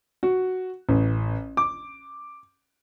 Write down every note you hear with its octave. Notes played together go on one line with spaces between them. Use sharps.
F#4
A1
D6